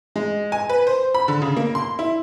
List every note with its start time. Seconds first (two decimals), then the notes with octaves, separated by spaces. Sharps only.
0.16 G#3
0.52 G#5
0.70 B4
0.87 C5
1.15 B5
1.28 D3
1.42 C#3
1.57 A#3
1.75 C6
1.99 E4